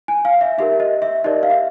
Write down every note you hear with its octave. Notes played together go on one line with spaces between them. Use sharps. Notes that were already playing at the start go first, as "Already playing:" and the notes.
G#5
F5
E5
D#4 G4 A#4 E5
D#5
E5
D#4 G4 A#4 D5 D#5
F5
E5